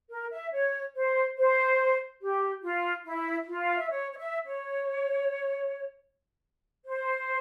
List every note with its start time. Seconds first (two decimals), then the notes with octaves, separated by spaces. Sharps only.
0.10 A#4
0.31 E5
0.52 C#5
0.94 C5
1.37 C5
2.21 G4
2.63 F4
3.05 E4
3.48 F4
3.62 F5
3.76 E5
3.90 C#5
4.12 C#5
4.18 E5
4.46 C#5
6.85 C5